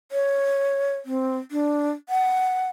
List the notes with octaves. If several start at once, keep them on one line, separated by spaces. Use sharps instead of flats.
C#5
C4
D4
F#5